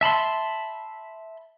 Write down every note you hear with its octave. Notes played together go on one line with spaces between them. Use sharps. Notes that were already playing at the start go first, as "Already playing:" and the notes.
E5 A5 B5 C6